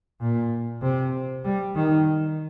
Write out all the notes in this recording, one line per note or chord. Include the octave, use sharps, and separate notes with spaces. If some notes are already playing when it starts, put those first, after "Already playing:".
A#2
C3
G3
D#3